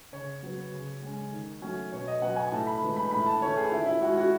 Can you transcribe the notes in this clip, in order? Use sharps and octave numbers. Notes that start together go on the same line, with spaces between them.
C#3 C#5
F#3 B3
C#3
G#3 C#4
D#3
F#3 A3 C#4
B2 C#5
D#5
F#3 B3 F#5
G#5
A2 A5
B5
E3 G#3 B3
B5
A2 B5
A5
E3 A3 C#4 C#5
G#4
D#3 E4
E4
G#3 C#4 F#4
F#4